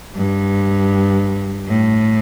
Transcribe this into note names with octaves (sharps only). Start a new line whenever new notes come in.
G2
A2